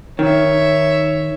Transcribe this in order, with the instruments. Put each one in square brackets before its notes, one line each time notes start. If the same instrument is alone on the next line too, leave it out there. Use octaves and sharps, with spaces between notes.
[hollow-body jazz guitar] D#3 [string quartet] C#5 E5